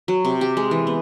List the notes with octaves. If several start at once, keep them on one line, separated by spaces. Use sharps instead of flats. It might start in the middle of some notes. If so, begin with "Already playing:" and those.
F#3
C3
G4
G#3
E3
B3